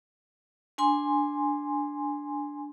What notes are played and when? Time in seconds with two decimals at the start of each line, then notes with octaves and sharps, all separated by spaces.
0.78 D4 G#5 C6